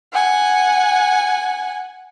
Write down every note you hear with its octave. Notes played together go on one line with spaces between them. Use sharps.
F#5 G#5